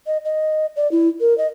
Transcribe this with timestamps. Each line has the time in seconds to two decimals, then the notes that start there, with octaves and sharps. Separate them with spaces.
0.07 D#5
0.25 D#5
0.76 D5
0.92 E4
1.21 A#4
1.38 D#5